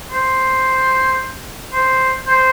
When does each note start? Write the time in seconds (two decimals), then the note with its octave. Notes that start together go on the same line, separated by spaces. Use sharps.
0.11 C5
1.72 C5
2.27 C5